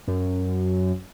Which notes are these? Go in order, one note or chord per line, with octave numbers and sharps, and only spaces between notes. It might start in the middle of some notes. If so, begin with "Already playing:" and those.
F#2